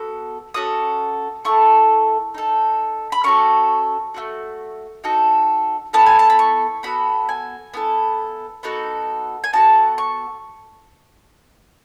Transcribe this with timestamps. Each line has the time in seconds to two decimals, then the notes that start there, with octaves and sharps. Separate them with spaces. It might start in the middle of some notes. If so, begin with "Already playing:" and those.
Already playing: B3 F#4 A4
0.54 C#4 F#4 A4 D#6
1.45 A3 E4 A4 C#6
2.34 D#4 A4
3.12 B5
3.24 C#4 F#4 A4 C#6
4.14 A3 C#4 F#4
5.04 D#4 F#4 A4
5.93 B3 E4 A4 A5
6.06 G#5
6.19 A5
6.30 B5
6.39 C#6
6.83 B3 F#4 A4 B5
7.29 G#5
7.74 B3 E4 A4
8.63 B3 D#4 F#4 A4
9.44 G#5
9.53 B3 F#4 A4 A5
9.98 C#6